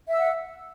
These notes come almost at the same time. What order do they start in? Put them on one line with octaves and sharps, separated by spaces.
E5 E6 F#5